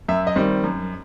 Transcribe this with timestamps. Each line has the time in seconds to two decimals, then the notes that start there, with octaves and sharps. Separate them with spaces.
0.09 F#2 E5
0.27 D#5
0.36 D#3 G3 C4
0.64 F#2